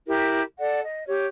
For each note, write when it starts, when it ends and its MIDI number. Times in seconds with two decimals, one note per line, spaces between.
0.08 0.41 64
0.08 0.41 67
0.08 0.41 70
0.59 0.80 69
0.59 0.80 74
0.59 0.80 78
0.83 1.07 75
1.07 1.26 67
1.07 1.26 73